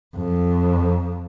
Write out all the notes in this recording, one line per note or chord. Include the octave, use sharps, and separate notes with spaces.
F2